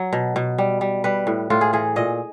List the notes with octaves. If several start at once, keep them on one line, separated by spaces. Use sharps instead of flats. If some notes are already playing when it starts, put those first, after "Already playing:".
Already playing: F#3
B2
B2
G3
G3
G3 B4
A2
A2 F4
G#4
E3 G#4
A#2 D#5